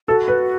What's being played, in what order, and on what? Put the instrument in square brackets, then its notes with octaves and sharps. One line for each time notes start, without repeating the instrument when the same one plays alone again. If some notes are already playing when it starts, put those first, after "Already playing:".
[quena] F#4 [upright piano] A4
[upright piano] B4